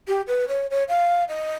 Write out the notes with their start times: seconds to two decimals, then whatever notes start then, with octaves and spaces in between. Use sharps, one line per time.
0.08 G4
0.27 B4
0.48 C#5
0.71 C#5
0.88 F5
1.29 D#5